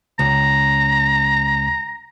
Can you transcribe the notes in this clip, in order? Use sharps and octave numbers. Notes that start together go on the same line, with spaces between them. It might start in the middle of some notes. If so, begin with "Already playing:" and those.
C#2 A#5